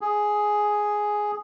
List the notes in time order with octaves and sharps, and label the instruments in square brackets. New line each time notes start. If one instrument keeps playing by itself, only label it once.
[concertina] G#4